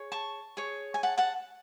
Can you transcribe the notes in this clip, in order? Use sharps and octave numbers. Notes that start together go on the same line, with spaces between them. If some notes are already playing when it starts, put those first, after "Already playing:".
Already playing: G#4 C#5
A5 C#6
G#4 C#5
G#5
F#5 A5
F#5 A5